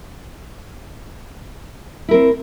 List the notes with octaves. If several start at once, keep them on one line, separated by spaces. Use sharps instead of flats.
C4 E4 A#4